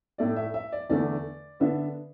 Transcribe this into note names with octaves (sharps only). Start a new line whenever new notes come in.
A2 A3 E4 D5
E5
E5
D5
E2 D3 A3 D5
D3 B3 D4 E5